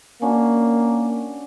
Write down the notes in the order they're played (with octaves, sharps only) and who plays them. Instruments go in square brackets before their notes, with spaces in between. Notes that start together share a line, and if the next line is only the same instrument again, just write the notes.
[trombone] A#3 [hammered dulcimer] C#4 D4 F#4